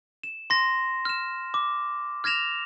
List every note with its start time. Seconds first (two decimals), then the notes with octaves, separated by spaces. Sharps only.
0.23 E7
0.50 C6 A#6
1.05 F6 E7
1.54 D6
2.24 F6 G#6 A#6 E7 F7